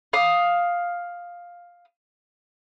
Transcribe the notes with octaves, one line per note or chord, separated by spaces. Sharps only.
F5 D#6